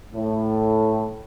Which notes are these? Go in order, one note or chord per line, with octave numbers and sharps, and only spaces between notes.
A2